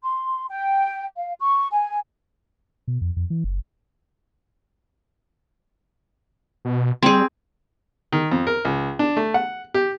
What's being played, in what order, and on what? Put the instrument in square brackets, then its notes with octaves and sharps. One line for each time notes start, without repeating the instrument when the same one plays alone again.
[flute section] C6
G5
F5
C#6
G#5
[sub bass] B2
F2
F2
E3
F#1
[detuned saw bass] B2
[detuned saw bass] G3 [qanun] C4 G#4
[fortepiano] D#3
F2
A#4
C#2
D4
A3
F#5
G4